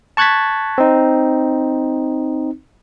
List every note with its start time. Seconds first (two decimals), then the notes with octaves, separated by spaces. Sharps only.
0.17 A5 C#6 F#6 G#6 A6 B6
0.78 C4 D#4